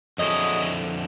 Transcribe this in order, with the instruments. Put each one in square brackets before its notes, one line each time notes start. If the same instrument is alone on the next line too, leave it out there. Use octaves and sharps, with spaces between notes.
[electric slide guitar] F2 D3 E4 [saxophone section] F#3 G#4 D#5